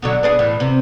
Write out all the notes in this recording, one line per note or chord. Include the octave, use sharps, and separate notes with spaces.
B2 D3 F#3
B3 D4 G#4
A2 E3
C3